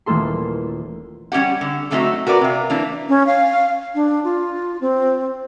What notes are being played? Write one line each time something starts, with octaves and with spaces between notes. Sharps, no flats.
D#1 E3 A3 A#3 A4 C6
G3 C#4 G4 F#5
D3
F#3 G3 A3 C4 D#4 F#4
F#4 A#4 B4 D5
C3 F4
E3 A#3 D4
C#4
F5
D4
F4
C4